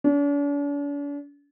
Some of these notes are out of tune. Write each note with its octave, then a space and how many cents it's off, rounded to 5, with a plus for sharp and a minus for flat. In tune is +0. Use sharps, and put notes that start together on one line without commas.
D4 -45